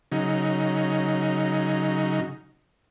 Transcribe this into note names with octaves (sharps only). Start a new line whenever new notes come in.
C#3 F#3 D#4